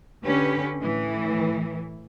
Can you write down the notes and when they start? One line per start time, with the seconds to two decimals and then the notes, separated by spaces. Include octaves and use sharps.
0.23 D3 C#4 G4 B4
0.79 A2 E3